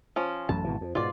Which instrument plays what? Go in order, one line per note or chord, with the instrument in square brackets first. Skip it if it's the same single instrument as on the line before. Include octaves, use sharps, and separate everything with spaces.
[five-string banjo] F3 C#4
[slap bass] A1 F#2 A2 [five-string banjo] A5
[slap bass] G#1 B2 E3
F2
[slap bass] G#2 B2 [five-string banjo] F4 D5